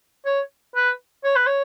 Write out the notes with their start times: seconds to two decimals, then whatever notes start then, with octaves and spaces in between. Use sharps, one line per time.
0.25 C#5
0.76 B4
1.24 C#5
1.36 B4
1.47 C#5